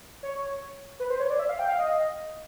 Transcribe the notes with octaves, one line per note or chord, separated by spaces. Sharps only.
C#5
B4
C5
C#5
D5
E5
F5
G5
F5
D#5